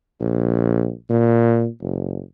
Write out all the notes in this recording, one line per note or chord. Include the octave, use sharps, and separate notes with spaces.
A#1
A#2
F#1